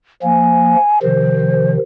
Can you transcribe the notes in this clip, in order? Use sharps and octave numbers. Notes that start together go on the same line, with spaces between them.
F3 A#3 G#5
C3 D#3 F3 C5